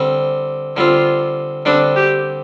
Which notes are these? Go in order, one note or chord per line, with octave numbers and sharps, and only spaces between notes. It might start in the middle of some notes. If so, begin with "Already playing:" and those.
Already playing: D3 G3 C4
D3 G3 C4 F4
D3 G3 C4 D4
G4